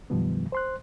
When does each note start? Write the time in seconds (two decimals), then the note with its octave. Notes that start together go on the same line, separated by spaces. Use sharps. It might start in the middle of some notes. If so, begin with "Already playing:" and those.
0.10 F#2 B2 D#3 F3 G3 B3
0.52 C5 C6 F#6